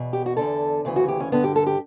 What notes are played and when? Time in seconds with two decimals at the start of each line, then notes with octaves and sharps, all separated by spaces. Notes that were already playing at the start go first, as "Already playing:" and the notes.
Already playing: E2 B2
0.13 G4
0.26 F#4
0.37 E2 D3 A4
0.85 D2 C#3 E3
0.96 F#4
1.08 G4
1.20 C#4
1.32 G2 D3 B3
1.44 G4
1.56 A4
1.66 G4